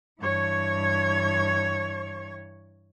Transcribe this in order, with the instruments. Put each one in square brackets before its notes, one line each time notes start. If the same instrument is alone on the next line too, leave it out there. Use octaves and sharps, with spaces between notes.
[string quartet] G2 E3 C#5 C#6 G#6